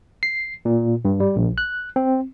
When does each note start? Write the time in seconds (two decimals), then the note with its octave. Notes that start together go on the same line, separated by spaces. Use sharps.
0.23 C7
0.65 A#2
1.05 G2
1.20 G3
1.36 A#1
1.58 F#6
1.96 C4